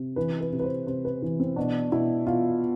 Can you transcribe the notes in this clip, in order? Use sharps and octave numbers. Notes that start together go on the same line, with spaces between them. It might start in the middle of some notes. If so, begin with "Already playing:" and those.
Already playing: C3
E3 B4
B4
C3
B4
C5
C3 C5
B4
E3
C4
B2 D4
B2 E4
B2 F4